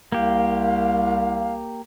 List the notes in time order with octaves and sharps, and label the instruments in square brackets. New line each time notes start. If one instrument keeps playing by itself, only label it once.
[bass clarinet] C2 [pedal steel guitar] A#3 G4 [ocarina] F5